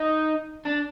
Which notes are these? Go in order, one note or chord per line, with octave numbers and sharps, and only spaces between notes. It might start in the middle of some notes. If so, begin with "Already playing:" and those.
Already playing: D#4
D4